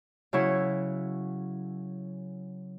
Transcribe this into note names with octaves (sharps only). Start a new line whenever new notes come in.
C#3 F#3 E4 C#5